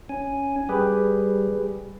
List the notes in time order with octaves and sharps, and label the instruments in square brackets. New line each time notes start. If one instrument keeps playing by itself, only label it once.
[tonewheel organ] C#4 G#5
[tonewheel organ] G3 [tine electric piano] G4 G#4 B4